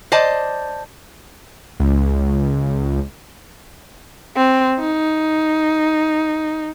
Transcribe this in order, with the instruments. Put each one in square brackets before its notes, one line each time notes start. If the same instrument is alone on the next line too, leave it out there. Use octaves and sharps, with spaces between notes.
[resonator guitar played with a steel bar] C5 D5 D#5 A5
[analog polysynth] C#2
[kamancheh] C4
D#4